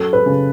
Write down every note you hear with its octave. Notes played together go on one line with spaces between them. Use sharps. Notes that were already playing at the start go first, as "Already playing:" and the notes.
Already playing: F#2 A4
B4
C#3